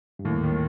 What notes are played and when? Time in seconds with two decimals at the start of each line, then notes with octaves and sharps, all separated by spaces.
0.19 G2
0.25 D#2 A2
0.43 D#3